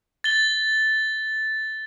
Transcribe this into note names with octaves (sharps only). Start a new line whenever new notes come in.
A6 G7